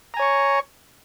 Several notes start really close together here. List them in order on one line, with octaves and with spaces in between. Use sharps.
A#5 G#5 C#5 C#6